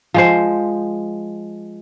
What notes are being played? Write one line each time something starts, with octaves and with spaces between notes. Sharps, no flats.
F3 G#3 C5